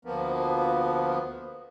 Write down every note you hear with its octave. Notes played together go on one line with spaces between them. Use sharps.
D2 F3 A#3 B3